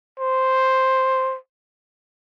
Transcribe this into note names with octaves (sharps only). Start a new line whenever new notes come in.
C5